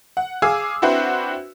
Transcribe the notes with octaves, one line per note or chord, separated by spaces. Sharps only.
F#5
G#4 F5 G#5 D6 E6
C4 D4 E4 F#4 B4 C5